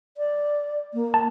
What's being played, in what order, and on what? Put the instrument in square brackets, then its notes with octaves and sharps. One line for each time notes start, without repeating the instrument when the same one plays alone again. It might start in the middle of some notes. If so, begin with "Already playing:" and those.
[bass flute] D5
A#3
[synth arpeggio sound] A5